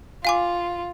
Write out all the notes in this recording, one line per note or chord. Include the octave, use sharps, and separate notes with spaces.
F4 F5 G#5 D6